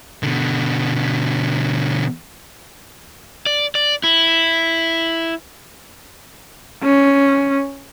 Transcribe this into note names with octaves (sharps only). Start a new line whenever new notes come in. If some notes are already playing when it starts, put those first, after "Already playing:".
B2 D3
D5
D5
E4
C#4